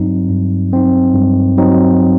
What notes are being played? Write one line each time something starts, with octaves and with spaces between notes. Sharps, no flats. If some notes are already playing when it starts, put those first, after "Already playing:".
Already playing: G2 F#3 C4 D#4
G2
F#3 C4 D#4
G2
F#3 C4 D#4